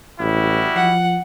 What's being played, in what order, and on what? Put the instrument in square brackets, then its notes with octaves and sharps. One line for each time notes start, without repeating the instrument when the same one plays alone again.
[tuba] A1 [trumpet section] G3 E4 F#4
[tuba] F3 [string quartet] F#5